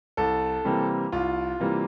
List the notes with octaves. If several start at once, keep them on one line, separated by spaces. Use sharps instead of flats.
C2 A4
C3 E3 G3 A#3
C2 F4
C3 E3 G3 A#3